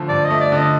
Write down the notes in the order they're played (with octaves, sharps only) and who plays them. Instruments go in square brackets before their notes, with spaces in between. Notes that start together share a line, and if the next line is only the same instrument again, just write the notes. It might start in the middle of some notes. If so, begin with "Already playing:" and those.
Already playing: [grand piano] D3 F3 A3
[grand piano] G2 [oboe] D5
[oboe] D#5
[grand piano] A3
[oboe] D5
[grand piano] D3
[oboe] D#5